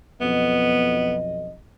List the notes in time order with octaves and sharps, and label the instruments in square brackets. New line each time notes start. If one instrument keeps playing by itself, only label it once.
[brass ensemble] B1 F2 D#5 [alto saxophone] B3